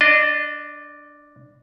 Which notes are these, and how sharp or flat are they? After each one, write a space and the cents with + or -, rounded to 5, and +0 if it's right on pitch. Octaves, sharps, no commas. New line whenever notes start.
D4 +0 D#5 -30